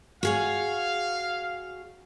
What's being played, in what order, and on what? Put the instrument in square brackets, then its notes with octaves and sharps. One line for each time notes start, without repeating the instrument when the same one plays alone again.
[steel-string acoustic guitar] F#4 G#4 C#5 [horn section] F5